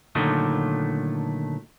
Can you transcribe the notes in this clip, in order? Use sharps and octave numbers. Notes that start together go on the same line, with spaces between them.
A#2 D3 D#3 F#3 A3